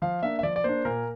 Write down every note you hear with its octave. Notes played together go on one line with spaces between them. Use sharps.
F3 F5
A#3 D4 E5
E5
F3 D5
D5
A#3 D4 C5
A#2 A#4